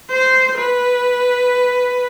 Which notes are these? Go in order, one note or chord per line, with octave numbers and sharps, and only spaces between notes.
C5 C6
B4